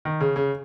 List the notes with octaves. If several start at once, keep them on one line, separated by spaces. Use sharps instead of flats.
D#3
C#3
C#3